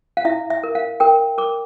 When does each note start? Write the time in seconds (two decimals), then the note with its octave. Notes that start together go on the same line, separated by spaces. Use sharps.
0.17 F5
0.25 E4 E5
0.50 E5
0.64 A#4
0.75 F5
1.00 A#4 G5
1.38 A#4 D6